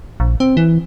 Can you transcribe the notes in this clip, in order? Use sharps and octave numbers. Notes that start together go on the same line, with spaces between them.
A#1
C4
E3